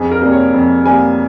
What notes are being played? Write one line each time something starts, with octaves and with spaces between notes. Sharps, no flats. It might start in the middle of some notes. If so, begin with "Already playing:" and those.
Already playing: F2 G#4
A#4
C3 G3 A#3
C#5
F2
C3 G3 A#3 G#5